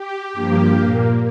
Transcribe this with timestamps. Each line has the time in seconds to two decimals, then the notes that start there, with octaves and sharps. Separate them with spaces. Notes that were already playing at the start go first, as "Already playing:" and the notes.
Already playing: G4
0.33 G2 F3 A#3
0.75 A#2 A#3